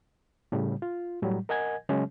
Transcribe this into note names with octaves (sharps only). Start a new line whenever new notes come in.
A2 C#3 G3
F4
A2 F#3 G3
A#4 D#5 F#5 G#5 G#6
C#3 F#3 G#3 C#4